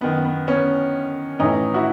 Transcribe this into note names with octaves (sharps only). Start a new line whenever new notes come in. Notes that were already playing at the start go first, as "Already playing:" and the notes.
F#2 D#3 B3
B3
B3 C#4
A2 E3 C#4 D#4
E4 F#4